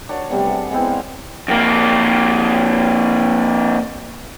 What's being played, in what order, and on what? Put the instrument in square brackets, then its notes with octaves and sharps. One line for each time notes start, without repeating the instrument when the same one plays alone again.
[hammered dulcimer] D4 F#4 A#4 C#5
C3 G3 A3 B3
G#4 A4 B4 F#5
G#3 B3 C4 E4
C5 F5 F#5
[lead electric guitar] F2 A#3